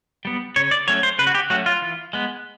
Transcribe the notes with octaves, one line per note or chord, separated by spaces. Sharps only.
G3 B3
C#3 C#5
D5
F#3 A3 C#4 C#5
C5
C#3 B4
F#4
G4
F#3 A3 C#4 F#4
F4
E3
G#3 B3